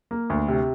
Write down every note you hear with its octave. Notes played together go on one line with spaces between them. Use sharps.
A#3
D2
C3